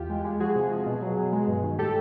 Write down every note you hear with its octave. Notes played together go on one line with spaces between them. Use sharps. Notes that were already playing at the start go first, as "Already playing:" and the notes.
Already playing: E2 F4 G4
G#3
G#3
F3 F#4 G#4
C3
F3
B2
F#3
B2
G#3
G2
D#3
A2 G4 A4